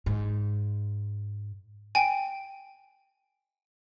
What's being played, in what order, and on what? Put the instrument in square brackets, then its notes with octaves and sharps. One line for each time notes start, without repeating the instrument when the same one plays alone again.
[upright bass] G#2
[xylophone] G5 G#5